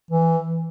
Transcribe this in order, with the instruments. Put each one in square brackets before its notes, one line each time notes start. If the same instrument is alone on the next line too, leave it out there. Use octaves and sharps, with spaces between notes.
[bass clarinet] E3